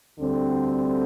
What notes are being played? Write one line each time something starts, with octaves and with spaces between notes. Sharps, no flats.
D2 D3 G3 C4